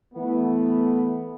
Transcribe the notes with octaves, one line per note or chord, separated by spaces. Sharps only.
E3 A3 B3